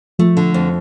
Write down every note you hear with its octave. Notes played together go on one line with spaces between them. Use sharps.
F3 A3
D3
F2